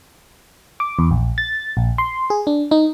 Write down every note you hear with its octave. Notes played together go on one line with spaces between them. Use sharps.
D6
E2
A#1
A6
A#1
C6
G#4
D4
D#4